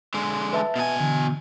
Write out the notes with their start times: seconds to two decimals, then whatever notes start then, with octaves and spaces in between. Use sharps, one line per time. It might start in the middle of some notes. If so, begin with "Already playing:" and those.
0.14 D3 G#3
0.53 B4 E5 A5
0.76 B2 G#5
1.00 D3 E3